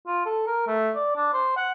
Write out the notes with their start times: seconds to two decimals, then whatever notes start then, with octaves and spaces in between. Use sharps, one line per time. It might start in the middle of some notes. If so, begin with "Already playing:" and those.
0.07 F4
0.26 A4
0.47 A#4
0.67 A3
0.95 D5
1.16 D4
1.34 C5
1.57 F#5